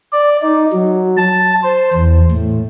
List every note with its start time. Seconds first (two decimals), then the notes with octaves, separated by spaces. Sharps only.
0.13 D5
0.42 D#4
0.72 F#3
1.17 A5
1.63 C5
1.94 E2
2.32 A2